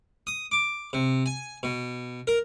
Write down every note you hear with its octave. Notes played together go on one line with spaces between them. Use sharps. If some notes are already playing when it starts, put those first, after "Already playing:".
D#6
D6
C3
G#5
B2
A#4